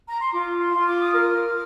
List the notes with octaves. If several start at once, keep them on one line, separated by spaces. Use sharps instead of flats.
A#5
C6
F4 D6
C6
F4
D6
D#6
A#4 F6